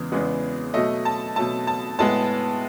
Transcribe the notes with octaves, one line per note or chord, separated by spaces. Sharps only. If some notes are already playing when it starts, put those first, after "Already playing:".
Already playing: E2 C#3 E3 G#3 B3
E2 C#3 E3 G#3 B3
B2 F#3 A3 D#5
A5
B2 F#3 A3 A5
A5
A2 G#3 B3 A5